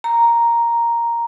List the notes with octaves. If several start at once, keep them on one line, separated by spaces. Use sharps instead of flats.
A#5